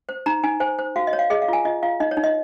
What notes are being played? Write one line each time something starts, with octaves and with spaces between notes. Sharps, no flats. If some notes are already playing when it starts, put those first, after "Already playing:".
C5
D#4 A#5
D#4 G#5
C5 G#5
C5
F#4 F5
D#5
C#5
F5
G#4 D#5
F5
F4 G#5
F4 D#5
F4 F5
D#4 D#5
C#5
D#4
D#5